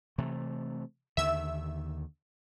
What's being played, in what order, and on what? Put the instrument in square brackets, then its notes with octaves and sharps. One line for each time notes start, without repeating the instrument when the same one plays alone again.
[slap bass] C3 E3 A3
[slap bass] D#2 D3 D#3 [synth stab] E5 E6